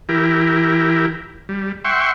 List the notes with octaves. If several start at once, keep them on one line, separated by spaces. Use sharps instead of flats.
E3 E4 G4 A#4
G3
E5 F#5 G5 C6 C#6